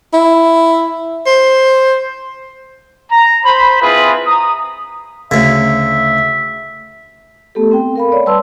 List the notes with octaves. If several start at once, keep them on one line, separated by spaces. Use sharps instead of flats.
E4
C5
A#5
C5 B5
C4 E4 F4 G#4 B4
A#5 D#6
D2 C#3 E5
A3 B3 G4 A4
C4 G5
A#4 F5 B5
C#5 D5
G3 B4 D5 A5 C6 E6